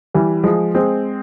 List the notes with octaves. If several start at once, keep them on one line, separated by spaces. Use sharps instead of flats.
E3 G3
F3 G#3
G#3 C4